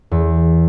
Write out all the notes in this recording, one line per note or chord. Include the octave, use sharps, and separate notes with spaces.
E2